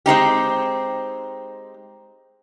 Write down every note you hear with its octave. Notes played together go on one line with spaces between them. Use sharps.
G#3 C4 D#4 G4